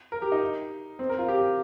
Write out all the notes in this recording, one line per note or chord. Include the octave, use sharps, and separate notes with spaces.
A#4
G4
D#4
C4
A#4
F4
G4